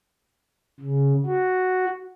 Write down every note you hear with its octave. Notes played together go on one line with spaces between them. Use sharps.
C#3
F#4